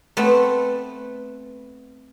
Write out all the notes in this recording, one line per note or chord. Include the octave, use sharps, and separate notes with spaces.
A3 B3 C4